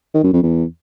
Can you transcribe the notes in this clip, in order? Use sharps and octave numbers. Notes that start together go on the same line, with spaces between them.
D#3
F#2
F2
E2